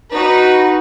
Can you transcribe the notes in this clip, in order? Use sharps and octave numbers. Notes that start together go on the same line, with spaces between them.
D#4 F#4 B4